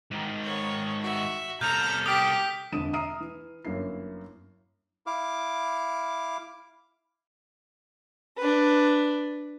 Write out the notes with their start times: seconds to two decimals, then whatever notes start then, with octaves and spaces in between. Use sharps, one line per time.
0.11 G#2 D#3
0.44 C#5
1.02 F#4 E5
1.61 C2 A4 A#5 F6 G6
2.06 G4 D6 D#6 F6 B6
2.72 E1 F2 D3 D#6 D#7 E7
2.93 E5 A#5 D#6 F6 C7 D#7
3.20 E3
3.65 G1 F#2 A#3 E4 C7
5.07 E4 F5 D6
8.36 D4 B4